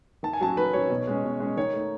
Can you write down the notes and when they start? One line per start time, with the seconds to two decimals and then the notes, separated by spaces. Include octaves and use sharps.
0.23 D#3 A5
0.33 G#5
0.41 F#3 C#4 A5
0.57 D#3 B4
0.73 F#3 C#4 C#5
0.90 B2
1.07 G#3 C#4
1.24 B2
1.40 G#3 C#4
1.57 D#3 C#5
1.73 A3 D#4